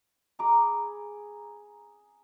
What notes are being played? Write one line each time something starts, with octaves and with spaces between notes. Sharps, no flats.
G#4 A#5 B5 D6